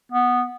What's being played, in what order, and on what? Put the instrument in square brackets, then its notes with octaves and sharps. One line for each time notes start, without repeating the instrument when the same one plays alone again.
[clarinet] B3